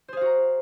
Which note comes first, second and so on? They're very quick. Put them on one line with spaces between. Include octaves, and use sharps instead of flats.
C5 G#4 F5 F#4 A#5